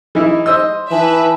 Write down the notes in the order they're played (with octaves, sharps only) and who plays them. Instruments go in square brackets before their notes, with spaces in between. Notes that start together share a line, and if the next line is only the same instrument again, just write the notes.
[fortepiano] E3 D#4 E4
[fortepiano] C5 D#5 E6 [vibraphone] C6
[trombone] E3 [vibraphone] D#4 G#5 A5 [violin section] B4 E5